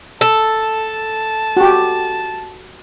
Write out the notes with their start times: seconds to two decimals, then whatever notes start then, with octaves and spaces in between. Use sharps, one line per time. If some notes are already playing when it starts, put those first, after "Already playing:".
0.21 A4 A5
1.57 F#4 G4